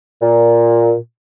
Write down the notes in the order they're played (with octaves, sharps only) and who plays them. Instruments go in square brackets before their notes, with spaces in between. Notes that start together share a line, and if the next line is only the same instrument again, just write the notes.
[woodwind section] A#2